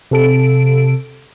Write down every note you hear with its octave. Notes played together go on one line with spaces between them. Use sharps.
C3 A4 D7